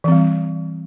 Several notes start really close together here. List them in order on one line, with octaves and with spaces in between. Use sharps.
E3 C4 G3